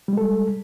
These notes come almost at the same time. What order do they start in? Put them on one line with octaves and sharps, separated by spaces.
G3 G#3 A4